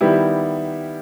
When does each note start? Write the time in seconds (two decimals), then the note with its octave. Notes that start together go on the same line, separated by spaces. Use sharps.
0.01 D#3 G3 B3 E4 G4